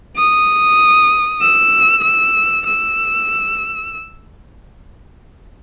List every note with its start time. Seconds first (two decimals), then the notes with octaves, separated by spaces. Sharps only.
0.17 D#6
1.42 E6
2.04 E6
2.66 E6